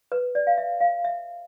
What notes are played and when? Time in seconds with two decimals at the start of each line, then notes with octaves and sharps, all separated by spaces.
0.12 B4
0.35 D5
0.47 F5
0.58 E5
0.81 F5
1.04 E5